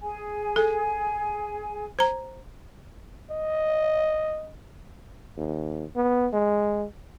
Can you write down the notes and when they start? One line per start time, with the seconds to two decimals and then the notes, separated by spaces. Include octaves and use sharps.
0.02 G#4 G#5
0.56 A4
1.99 C5 A#5
3.31 D#5
5.37 D#2
5.96 B3
6.33 G#3